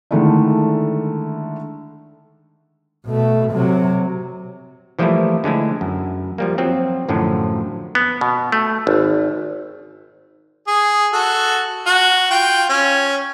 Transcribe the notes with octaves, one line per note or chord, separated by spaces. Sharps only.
D3 D#3 G#3 A3 D4 E4
B2 A3
C3 F#3
E3 F3 G3 A3 A#3 E4
D3 G#3 A3 E4
F#2
F3 G3 A#3
F3 F#3 C4
F#2 A2 D3 F3 F#3
B3
B2
A3
G#1
G#4
F#4 A4
F#4
F4 G5
C#4